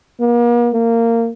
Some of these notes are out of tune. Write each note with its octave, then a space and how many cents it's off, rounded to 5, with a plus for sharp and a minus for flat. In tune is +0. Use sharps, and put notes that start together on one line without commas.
A#3 +40
A#3 -20